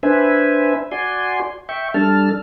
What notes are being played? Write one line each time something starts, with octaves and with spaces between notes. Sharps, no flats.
D4 B4 C5 E5 G#5
F#4 D5 G#5 C6
E5 G5 C#6
G3 D4 A4 A5 F6